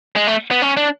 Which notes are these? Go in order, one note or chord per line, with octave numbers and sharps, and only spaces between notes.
G#3
A3
B3
C#4
D4